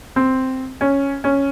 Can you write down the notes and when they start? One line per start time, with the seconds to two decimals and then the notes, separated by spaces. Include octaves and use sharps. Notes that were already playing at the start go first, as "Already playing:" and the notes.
0.16 C4
0.81 C#4
1.24 C#4